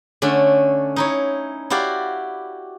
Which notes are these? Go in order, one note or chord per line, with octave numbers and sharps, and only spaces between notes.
D3 A3 C#4 D4
D#4 E4 C#5
E4 F#4 G4 D5 F5